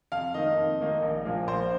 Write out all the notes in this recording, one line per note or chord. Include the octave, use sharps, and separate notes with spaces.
F2 F5
D#3 A#3 D#4 D#5
F2
D#3 A#3 D#4
A#1
A#2 F3 A#3
A#1 C5